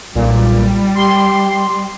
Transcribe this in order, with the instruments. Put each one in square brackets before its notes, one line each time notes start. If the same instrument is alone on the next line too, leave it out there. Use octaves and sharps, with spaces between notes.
[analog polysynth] B1 A#2 [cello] G3
[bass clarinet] G4 [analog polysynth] C6